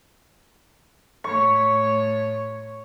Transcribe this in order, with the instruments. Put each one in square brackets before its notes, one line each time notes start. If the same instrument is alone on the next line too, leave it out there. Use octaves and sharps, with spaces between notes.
[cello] A2 C#5 [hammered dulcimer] C#6